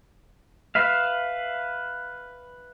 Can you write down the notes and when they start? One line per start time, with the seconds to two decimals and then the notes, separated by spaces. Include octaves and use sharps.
0.75 B4 E5 F5